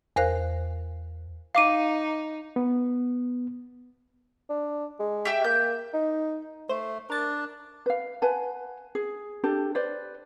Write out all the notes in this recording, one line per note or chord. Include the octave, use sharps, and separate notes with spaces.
E2 A#4 C5 F5 F#6
D#4 F5 D6 D#7
B3
D4
G#3
G4 E5 G5
A#3 G6
D#4
A3 C5
D4 A#4 A6
B4 F5
B4 F#5 G#5 A5
G#4
D4 G4 A4
B4 C5 D5